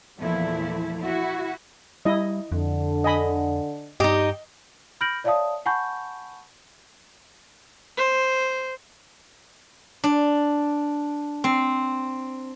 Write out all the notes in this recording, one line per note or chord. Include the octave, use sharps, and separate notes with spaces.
E2 A#2 F3 A3 E4
E4 F#4
G3 E4 D#5
F2 D3
D#5 G#5 B5
G2 D#4 G4 D#5
B5 F6 G6 A#6 D7 F#7
C#5 D5 E5 F5 A5 D#6
F#5 G#5 A5 B5 C#6 G6
C5
D4
C4